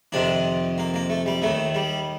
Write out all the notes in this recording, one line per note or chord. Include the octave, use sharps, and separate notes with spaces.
F2 C3 D#3 D4
A#3
A#3
A3
G3
D#2 D#3 A3
G3